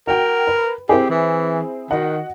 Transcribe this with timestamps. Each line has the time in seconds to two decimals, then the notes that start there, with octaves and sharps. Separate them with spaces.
0.07 F#4 A#4 G5
0.47 B4
0.89 C4 E4 G4 G#4
1.10 E3
1.91 D#3 F#4 D#5 F#5